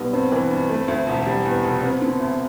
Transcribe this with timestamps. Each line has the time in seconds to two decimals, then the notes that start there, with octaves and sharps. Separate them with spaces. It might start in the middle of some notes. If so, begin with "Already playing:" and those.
Already playing: B1 G3 B3
0.13 G2 C4
0.32 E3
0.51 G2
0.70 A3
0.88 D2
1.07 E1
1.26 G3
1.45 E2
1.64 F1
1.83 B3 C4
2.02 D3
2.20 D2